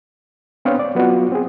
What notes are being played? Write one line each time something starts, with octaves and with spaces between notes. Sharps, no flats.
B3 C4 D4 B4 C#5 F5
D5
F#3 B3 F4 F#4
C4 G#4